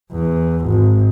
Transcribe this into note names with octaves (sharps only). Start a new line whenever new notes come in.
E2
G#1